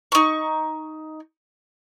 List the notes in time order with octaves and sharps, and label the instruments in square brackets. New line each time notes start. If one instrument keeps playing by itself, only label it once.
[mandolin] D#4 C#6